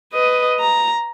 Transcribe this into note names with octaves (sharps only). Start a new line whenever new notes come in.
B4 D#5
A#5